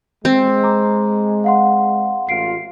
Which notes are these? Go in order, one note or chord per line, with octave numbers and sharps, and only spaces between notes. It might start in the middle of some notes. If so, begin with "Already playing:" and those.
G#3 C4
A#5 D6
F5 F#5 C6
A1 F4 C7 D7